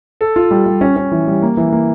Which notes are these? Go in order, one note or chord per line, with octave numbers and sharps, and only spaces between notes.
A4
F4
G3
G3
C#4
C#4
E3
G3
A#3
E3
A#3